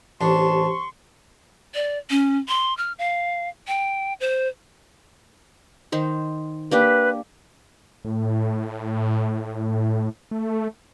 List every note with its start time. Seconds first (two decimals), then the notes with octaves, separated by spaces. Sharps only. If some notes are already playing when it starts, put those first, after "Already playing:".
0.21 A1 D4 G4 C5 A5 C6 C#6
1.75 D5
2.10 C#4
2.48 C6
2.77 F6
2.99 F5
3.68 G5
4.20 C5
5.92 D#3 D#4 C5
6.71 A#3 D4 G4 B4
8.05 A2
10.31 A3